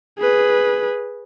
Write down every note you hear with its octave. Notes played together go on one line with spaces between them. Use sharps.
G#4 B4